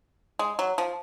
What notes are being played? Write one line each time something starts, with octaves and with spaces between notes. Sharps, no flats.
G#3
F#3
F3